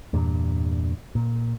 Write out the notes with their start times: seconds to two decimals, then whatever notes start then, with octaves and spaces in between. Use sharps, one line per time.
0.13 E2 G2 A#2
1.15 A#2